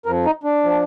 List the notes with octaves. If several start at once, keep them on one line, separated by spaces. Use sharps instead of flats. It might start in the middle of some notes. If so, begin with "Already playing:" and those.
F2 F3 A#4
D#4
D4
F3